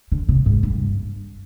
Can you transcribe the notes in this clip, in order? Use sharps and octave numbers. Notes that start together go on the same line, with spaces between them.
D3
C3
G#2
G2